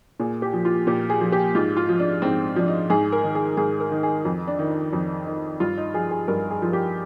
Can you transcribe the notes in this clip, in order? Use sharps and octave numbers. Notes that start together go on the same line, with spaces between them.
A#2 G#4
G4
F3
F4
A#2 G4
G#4
F3
G4
G#2 F4
F4
F3
D4
G#2 C4
F3 D4
D#4
G#2 G#4
A#4
D#3
G#4
G#2 G#4
A#4
D#3
G#4
F2
D4
D#3
D#4
F2
D#3
G2 F4
D#4
F3 G#4
G#4
G2 A#4
G#4
F3 F4
G4